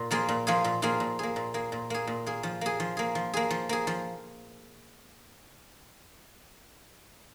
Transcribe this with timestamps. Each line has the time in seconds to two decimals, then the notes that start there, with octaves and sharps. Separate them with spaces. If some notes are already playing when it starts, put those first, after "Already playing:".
Already playing: A#2
0.11 F3 A#3 F4 G#4
0.29 A#2
0.47 F3 A#3 F4 G#4
0.64 A#2
0.82 F3 A#3 F4 G#4
1.00 A#2
1.19 A#3 G#4
1.36 A#2
1.54 A#3 G#4
1.72 A#2
1.90 A#3 G#4
2.07 A#2
2.26 A#3 G#4
2.43 F3
2.61 A#3 G#4
2.80 F3
2.97 A#3 G#4
3.15 F3
3.34 A#3 G#4
3.50 F3
3.69 A#3 G#4
3.87 F3